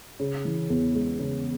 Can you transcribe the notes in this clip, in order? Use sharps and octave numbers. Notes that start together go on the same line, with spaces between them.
C#3
E3
E2
G#3
C#3